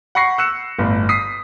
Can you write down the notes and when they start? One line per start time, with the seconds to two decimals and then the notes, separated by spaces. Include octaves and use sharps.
0.15 F#5 B5 C#6 A#6 C7
0.38 E6 F#6 C#7 E7
0.78 G1 A2
1.09 D#6 B6 C7